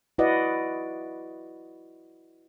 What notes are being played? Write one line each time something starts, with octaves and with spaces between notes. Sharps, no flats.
E4 F#4 B4 D5 D#5 F#5